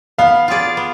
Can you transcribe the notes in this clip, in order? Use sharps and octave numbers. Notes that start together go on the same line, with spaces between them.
B3 F5
F4 G#4 D5
B3